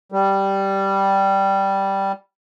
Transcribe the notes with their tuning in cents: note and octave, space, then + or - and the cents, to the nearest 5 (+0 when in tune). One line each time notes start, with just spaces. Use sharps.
G3 -5